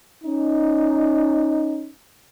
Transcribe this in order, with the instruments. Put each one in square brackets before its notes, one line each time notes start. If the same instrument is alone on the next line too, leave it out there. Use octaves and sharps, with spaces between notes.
[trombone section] C#4 D#4